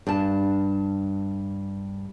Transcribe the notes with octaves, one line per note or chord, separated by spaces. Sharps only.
G2 A5